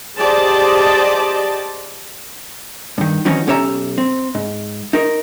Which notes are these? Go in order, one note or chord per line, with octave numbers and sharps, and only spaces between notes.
G4 G#4 C5 D5 D#5 A5
G2 D#3
D#3 E3 F#3 C4 C#4 D#4
B1 C#4 G4 C#5 E5 A#5
C4
G#2
D#4 A#4